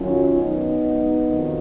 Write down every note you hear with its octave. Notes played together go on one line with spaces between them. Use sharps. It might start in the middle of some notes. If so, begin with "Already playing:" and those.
Already playing: F#2 D#3 F#3 C#4 F4
F#2 D#3 F#3 B3 D#4
G#2 F#3
F2 D#3 F#3